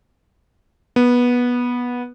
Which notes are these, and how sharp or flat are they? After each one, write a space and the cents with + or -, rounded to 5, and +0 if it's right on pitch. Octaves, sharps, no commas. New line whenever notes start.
B3 -15